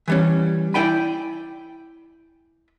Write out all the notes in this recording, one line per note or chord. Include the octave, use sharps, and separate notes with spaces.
E3 G3 C#4
E4 D5 G5 G#5 B5